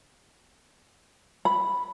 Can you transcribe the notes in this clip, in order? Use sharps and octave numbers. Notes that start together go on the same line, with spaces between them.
B5